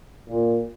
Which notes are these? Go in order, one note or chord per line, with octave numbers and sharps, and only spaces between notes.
A#2